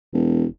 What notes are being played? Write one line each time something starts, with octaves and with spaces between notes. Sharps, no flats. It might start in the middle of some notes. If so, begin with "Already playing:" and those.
E1